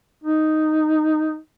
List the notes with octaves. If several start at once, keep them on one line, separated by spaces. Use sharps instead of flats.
D#4